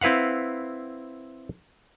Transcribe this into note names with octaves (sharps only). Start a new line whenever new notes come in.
C4 E4 B4 F5 F#5